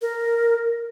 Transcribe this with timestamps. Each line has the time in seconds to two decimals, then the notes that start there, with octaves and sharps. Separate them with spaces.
0.02 A#4